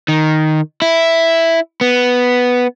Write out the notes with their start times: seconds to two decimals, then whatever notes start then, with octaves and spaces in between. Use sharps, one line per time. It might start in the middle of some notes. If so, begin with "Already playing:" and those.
0.08 D#3
0.82 E4
1.81 B3